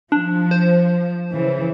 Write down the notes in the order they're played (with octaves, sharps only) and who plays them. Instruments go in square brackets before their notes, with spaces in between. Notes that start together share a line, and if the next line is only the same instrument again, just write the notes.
[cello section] F3 [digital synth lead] D4
[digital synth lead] C5
[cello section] C#3 E3